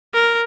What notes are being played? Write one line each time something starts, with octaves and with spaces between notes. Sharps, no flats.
A#4